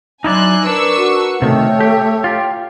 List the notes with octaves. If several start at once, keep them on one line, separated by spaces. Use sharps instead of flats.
F#3 D#4 E4 D5 G#5 C6 F#6
D4 A#4 B4 C#6 E6
F#4
C3 D#3 A3 C#5 G5
G4
F4 G4